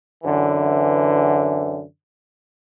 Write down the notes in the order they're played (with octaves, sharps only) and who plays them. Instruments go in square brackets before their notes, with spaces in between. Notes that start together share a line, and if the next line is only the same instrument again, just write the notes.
[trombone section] F#2 D3 E3